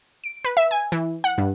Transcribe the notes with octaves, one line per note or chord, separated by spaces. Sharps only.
D7
B4
E5
G#5
E3
F#5
G2